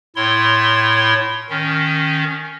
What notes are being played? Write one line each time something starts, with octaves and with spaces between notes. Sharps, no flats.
A2 E4 C#5 C6
D#3 C#4